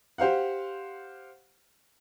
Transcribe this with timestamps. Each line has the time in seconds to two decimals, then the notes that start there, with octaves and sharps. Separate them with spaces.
0.18 G4 C5 F5 F#5